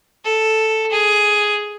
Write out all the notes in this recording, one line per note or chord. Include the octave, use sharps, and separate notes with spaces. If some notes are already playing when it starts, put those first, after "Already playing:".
A4
G#4